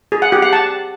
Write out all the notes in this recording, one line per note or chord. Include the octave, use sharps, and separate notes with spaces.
G#4
F#5
G4
F#5
A5